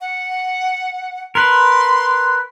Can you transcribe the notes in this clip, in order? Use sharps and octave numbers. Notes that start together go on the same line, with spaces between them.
F#5
A#4 B4 C6